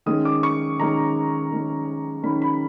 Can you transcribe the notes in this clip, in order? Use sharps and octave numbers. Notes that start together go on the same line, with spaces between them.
D#3 G#3 C#4 D#6
D6
C#6
D#3 G#3 C#4 A#5
D#3 G#3 C#4
D#3 G#3 C#4 B5
B5